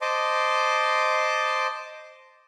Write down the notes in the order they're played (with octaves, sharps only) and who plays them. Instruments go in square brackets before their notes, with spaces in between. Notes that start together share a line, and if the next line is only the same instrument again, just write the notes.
[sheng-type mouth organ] C5 D#5 A5 C6 D6